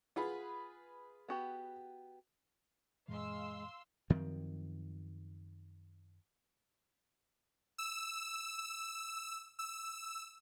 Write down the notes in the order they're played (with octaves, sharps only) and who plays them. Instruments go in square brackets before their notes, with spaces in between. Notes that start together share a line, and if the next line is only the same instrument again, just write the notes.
[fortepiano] F4 G#4 B4 [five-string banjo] F#5
[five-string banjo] B3 F#4 G4
[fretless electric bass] F#2 A#2 E3 [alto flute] G#3 [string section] F5 C6 E6
[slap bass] F#2 D#3 F3 C4
[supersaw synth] E6
E6